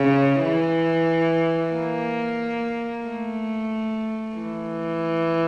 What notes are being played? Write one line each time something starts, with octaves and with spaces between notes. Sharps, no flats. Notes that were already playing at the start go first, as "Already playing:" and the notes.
Already playing: C#3
E3
A#3
A3
E3